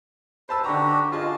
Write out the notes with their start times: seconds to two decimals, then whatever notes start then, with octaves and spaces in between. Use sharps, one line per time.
0.49 B4 C5 A5 E6
0.64 D3 D4 F#4 G4 A#5
1.12 F4 G#4 D#5 A5